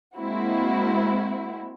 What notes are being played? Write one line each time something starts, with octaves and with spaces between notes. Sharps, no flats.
G#3 A#3 C4 E4 F#4